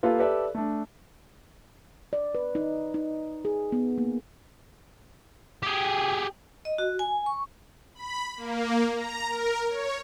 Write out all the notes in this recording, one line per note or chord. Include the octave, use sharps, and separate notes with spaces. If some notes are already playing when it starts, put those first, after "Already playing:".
A#3 F4 G4 A4 B4
G4 A4 B4 D5 E5
A3 D4
D5
B4
D#4
D#4
G#4
B3
A#3
G4 G#4
D#5
F#4
G#5
C#6
B5
A#3
A#5
A#4
C#5